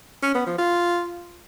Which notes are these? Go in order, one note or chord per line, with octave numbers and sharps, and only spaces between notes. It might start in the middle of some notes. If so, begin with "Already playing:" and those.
C#4
B3
F3
F4